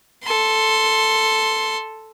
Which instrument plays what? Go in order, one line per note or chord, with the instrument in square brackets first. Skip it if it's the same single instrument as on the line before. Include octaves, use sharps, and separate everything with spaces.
[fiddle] A4 C6